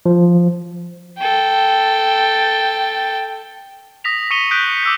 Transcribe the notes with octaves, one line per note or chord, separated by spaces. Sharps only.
F3
A4 G5
D#6 A#6 B6 F7
C#6 D#6 C#7 D#7 F7 G7
C#6 D#6 F#6 G6 B6 D7
D6 E6 G6